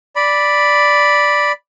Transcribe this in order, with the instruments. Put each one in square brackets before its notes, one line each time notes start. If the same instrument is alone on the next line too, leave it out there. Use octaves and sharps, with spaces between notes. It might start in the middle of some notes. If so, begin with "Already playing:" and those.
[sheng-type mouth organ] D5 B5